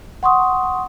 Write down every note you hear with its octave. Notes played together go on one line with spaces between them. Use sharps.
F#5 C6 C#6 D#6